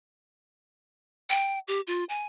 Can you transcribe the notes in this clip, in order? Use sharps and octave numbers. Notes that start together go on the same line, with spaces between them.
G5
G4
F4
G#5